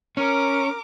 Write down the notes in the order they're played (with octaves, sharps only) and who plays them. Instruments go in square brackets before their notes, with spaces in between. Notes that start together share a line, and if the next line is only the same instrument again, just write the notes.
[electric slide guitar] C#4 [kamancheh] A#4 D6